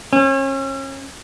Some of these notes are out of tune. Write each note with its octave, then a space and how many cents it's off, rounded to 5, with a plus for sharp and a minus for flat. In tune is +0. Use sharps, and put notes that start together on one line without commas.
C#4 -35